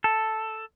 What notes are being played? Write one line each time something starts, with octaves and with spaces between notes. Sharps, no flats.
A4